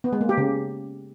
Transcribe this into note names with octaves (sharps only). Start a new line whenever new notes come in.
B3
G#3
A#3
G4
C#3